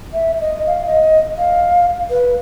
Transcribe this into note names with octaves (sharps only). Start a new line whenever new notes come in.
E5
D#5
F5
D#5
F5
B4